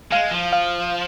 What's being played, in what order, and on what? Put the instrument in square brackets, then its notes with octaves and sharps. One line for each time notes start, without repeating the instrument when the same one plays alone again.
[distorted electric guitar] G#3 [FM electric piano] F5
[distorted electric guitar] F3
[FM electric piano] F5